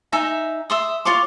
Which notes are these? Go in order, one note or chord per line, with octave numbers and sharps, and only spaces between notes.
D#4 E5 G#5 A#5
E5 C6 D#6
F4 C#5 C6 D6